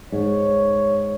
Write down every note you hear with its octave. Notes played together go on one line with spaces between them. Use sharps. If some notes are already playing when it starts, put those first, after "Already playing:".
G#2 C#5